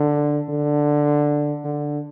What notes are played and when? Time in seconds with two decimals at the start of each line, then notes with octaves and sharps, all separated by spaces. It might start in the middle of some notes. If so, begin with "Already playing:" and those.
Already playing: D3
0.49 D3
1.65 D3